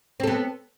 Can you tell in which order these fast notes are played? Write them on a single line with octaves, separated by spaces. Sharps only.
C4 A4 B3